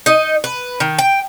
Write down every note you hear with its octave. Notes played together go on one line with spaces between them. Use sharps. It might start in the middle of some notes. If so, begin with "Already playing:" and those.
D#4 D#5
B4
D#3
G5